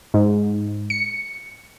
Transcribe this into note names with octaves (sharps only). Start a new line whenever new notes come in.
G#2
C#7